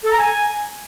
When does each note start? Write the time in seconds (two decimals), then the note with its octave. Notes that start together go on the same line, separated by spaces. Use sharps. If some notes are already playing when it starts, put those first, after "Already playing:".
0.04 A4
0.12 A#5
0.19 G#5